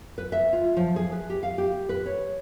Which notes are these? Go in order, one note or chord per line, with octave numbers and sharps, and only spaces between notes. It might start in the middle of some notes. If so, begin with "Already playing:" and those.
B4
E5
F4
F3
G#4
B4
G4
F5
G4
B4
C#5